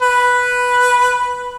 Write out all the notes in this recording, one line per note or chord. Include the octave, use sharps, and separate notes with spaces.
B4